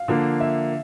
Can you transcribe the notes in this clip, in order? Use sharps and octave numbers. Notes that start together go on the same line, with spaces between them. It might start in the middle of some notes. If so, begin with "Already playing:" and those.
Already playing: F5
D3 F3 A#3
E5